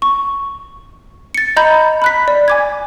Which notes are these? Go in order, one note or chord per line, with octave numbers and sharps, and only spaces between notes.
C#6
A6 C#7
D#5 A#5 B5 G6
B5 F#6 B6
D5
G#5 D6 G#6